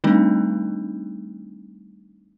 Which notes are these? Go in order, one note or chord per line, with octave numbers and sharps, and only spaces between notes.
D#3 G3 A3 C4 D4 D#4